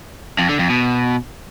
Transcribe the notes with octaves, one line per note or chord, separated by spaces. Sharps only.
F2
D3
F2
B2